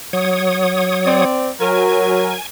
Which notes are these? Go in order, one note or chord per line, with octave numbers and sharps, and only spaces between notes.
F#3 C#5 D#6
C4 D5
F#3 A#4 G#5